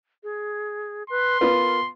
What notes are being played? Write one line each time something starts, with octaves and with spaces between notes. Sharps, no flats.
G#4
B4 C6
B3 F4 A#4 B4